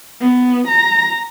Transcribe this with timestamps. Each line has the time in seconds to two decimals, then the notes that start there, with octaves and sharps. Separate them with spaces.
0.21 B3
0.68 A#5